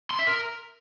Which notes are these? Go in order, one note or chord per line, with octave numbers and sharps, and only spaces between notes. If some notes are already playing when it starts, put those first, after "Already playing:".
C6
E5
A#4